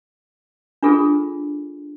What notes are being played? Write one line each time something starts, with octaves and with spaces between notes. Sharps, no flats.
D4 F4 G#4 A4